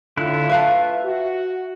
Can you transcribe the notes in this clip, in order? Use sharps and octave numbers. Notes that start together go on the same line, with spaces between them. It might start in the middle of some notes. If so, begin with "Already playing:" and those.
A2 D3 E4 F4 F#6
B4 E5 F5 A5
F#4